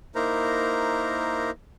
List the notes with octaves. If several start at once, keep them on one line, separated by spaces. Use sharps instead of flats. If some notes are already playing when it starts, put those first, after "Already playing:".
A#3 D#4 E4 A#4 C5 A#5